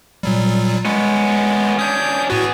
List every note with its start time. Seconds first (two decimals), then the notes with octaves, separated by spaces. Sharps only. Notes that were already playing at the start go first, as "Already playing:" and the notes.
0.23 A#2 F#3 G3
0.85 G#3 B3 C#4
1.79 C#4 D4 D#6 G6
2.30 A2 B3 F#4 G#4